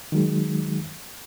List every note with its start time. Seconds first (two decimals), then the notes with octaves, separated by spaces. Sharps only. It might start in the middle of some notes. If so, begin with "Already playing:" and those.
0.12 D#3 F#3 G#3